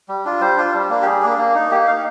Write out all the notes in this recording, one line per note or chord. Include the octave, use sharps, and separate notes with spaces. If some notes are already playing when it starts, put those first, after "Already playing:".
G3
D4 F4
G3 C5
D4 F4
G3
A#3 D4
G4
G3 G#4
A#3 D4
A#3
D#4
A#3 G4
D#4 F5